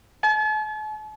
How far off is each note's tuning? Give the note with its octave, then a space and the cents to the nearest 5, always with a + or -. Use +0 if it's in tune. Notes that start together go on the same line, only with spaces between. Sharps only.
A5 -45